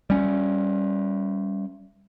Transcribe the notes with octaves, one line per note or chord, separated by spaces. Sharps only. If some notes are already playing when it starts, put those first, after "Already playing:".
G3 C#4